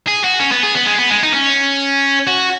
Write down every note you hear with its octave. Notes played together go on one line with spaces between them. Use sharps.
G#4
F#4
C#4
B3
G#4
B3
G#3
B3
G#3
D#4
C#4
F#4